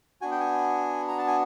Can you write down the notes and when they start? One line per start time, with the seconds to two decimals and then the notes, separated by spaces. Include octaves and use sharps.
0.22 B3 D4 F#4 G#5
0.31 G5
0.40 G#5
1.08 A#5
1.18 A5
1.27 G#5